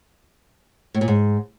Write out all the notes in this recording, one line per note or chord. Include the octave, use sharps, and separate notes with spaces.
A2
A#2
G#2